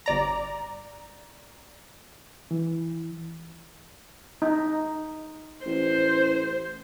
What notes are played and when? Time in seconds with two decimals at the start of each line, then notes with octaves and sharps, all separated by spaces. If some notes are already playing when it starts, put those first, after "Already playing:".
0.06 G1 D5 A#5
2.51 E3
4.42 D#4
5.66 A1 C5